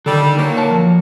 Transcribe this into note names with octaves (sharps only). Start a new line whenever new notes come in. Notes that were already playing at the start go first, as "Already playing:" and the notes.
D3 D#3 G3 A4
A#2 F#3 A#3
C#5 A5
F3